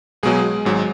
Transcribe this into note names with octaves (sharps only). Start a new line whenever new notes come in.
B1 B2 F#3 G#3 G#4
G#1 G#2 F#3